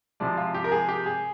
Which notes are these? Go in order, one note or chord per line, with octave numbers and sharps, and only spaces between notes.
C3 F3 G#3 D5
F4
G4
A#4
G#4
G4
G#4